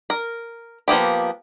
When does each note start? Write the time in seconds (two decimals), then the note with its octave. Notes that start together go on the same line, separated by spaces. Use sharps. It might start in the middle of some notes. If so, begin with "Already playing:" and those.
0.10 A#4
0.88 F3 A#3 B3 G4